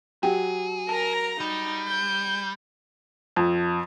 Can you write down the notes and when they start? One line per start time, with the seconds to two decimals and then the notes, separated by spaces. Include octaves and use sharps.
0.23 F#3 G4 G#4 G5
0.89 A#4 A5 A#5
1.40 G3 D#4
1.88 G6
3.36 F2